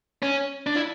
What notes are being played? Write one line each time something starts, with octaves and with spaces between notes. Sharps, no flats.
C#4
D4
E4